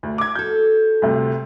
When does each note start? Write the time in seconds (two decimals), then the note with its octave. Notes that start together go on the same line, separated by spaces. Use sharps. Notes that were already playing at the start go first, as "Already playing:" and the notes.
0.03 D2
0.18 D6 G#6
0.35 F#4 A4 G6
1.02 D2 G2 C3